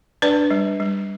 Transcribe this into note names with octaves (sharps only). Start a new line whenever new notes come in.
D4 B4 D5
G3
G3